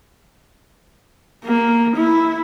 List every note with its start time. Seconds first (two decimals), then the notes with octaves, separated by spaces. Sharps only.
1.45 A#3
1.96 E4